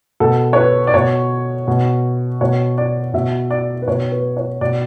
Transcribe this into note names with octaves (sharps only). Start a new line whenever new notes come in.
B2 A4
C#5
B4
D5
B2 C#5
B2
B2 C#5
D5
B2 E5
D5
B4
B2 C#5
B4
C#5
B2 D5